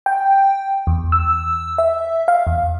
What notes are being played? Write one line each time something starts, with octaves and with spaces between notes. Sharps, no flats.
G5
E2
E6
E5
F5
E2